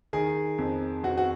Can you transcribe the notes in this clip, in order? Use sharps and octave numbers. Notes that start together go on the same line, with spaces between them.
D#3 G#4
F2
F2 F#4
F#4